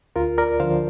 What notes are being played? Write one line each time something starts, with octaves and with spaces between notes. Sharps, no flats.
D2 F4 A#4
A#4 D5
D3 F3 C5 F5